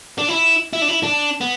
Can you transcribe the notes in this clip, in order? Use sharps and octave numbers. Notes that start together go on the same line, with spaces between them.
D4
E4
E4
D4
E4
D4
B3